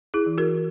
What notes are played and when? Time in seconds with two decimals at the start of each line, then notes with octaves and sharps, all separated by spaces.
0.14 E4 G#4
0.26 E3
0.38 F#4 A#4